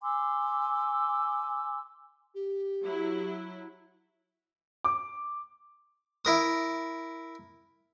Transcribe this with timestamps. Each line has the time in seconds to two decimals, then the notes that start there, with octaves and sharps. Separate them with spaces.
0.03 G#5 C6 D6 E6
2.34 G4
2.84 F#3 E4
4.84 D6
6.25 E4 A#4 D#6